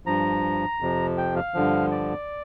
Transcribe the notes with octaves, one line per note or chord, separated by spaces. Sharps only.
G2 F3 A#5
F2 C3 F3
G5
F5
G2 D3 F3
D5